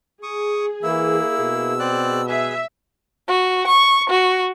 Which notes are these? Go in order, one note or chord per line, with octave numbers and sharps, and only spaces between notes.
G#4 C#6 D#6
E3 A#3 E4 E6
B2
C4 D5 F#6
G#4 B4 E5
F#4
C#6
F#4